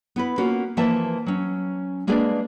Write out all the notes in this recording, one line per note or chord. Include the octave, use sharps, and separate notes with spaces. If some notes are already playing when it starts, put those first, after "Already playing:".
B3 E4 B4
A#3 C#4 F4 F#4
E3 F3 A#3 E4 E5 A5
F#3 C#4
G#3 A#3 D4 G#4 B4 D5